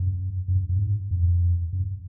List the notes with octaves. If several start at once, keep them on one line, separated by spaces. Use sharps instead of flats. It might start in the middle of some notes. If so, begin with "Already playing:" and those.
Already playing: F#2
F#2
F#2
G#2
F2
F#2